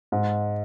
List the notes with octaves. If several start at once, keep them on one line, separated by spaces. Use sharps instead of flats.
G#2